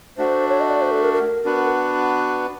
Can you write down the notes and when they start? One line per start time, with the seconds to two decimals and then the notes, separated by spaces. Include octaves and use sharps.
0.17 A3 D4 F#4 C5
0.49 C#5
0.60 D#5
0.70 D5
0.82 C5
0.92 A4
1.03 A#4
1.14 A#4
1.45 B3 D4 F#4 B4